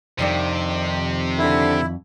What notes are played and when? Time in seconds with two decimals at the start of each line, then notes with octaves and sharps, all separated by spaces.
0.19 F2 C3 D#3 D4
1.38 D3 E4